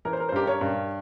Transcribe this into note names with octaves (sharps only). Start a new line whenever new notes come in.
E3 A#4
C5
A#4
C5
G2 G4 A#4
A#4 C#5
G2